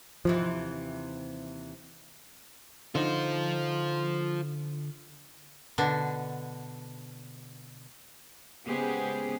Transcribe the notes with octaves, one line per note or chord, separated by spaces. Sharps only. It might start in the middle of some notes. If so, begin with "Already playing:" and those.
D#2 C3 E3 F3
D3 D#4 F4 C5
B2 D3 D4
C#3 G#3 B3 G4 G#4 C5